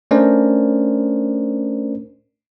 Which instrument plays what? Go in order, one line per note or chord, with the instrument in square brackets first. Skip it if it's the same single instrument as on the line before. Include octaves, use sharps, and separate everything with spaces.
[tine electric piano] A3 C#4 D4 A#4 C5 D5